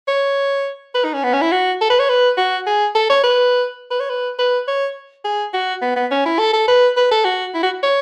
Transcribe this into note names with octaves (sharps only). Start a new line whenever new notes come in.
C#5
B4
D#4
C#4
B3
C#4
E4
F#4
A4
B4
C#5
B4
F#4
G#4
A4
C#5
B4
B4
C#5
B4
B4
C#5
G#4
F#4
B3
B3
C#4
E4
A4
A4
B4
B4
A4
F#4
E4
F#4
C#5